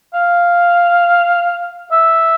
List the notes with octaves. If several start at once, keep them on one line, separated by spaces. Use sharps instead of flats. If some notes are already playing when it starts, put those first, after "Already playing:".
F5
E5